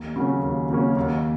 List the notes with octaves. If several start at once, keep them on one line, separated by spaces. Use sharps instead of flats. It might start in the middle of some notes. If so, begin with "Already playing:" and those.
Already playing: D#2
C#3 F#3 A#3 C#4
D#2
C#3 F#3 A#3 C#4
D#2